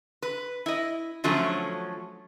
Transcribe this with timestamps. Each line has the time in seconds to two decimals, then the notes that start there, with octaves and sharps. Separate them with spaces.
0.22 B4
0.66 E4 D#5
1.24 D3 F3 F#3 A3 C#4